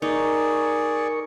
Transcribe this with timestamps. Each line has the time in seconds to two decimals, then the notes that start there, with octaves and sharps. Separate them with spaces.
0.02 D#4 G#4 A#4 D5 C#6